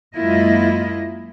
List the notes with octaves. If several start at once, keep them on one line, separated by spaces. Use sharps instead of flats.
F#2 G#3 A#3 E4 F4 D#5